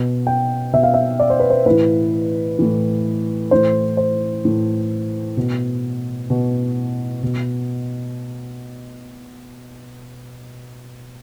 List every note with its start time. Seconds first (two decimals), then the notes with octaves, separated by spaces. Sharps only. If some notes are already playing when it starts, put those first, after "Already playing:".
Already playing: B2
0.27 G5
0.73 B2 E5
0.83 F5
0.94 E5
1.20 D5
1.30 C5
1.40 B4
1.50 C5
1.66 A2 E3 B4
2.59 A2 E3
3.51 A2 E3 C5
3.97 C5
4.45 A2 E3
5.37 B2
6.30 B2
7.23 B2